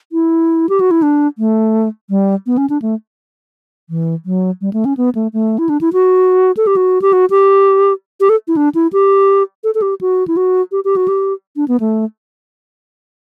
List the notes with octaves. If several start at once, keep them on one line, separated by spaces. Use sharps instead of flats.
E4
G4
F#4
E4
D4
A3
G3
B3
C#4
D4
A3
E3
F#3
G3
A3
C#4
B3
A3
A3
E4
D4
E4
F#4
A4
G4
F#4
G4
F#4
G4
G4
A4
E4
D4
E4
G4
A4
A4
G4
F#4
E4
F#4
G4
G4
F#4
G4
D4
B3
A3